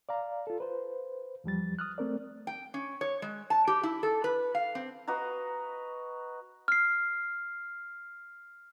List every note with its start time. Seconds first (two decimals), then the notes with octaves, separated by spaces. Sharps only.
0.09 D5 F5 A#5
0.47 F4 A4
0.60 B4 C5
1.44 E2 F3 G3 A6
1.79 D#6 F6 F#6
1.98 A3 C4 A#4 D5
2.47 G5
2.74 C#4
3.01 C#5
3.22 G#3
3.50 A5
3.67 G4
3.83 E4
4.03 A4
4.24 B4
4.55 F5
4.75 C4
5.08 F#4 B4 D#5 A#5
6.68 F6 C7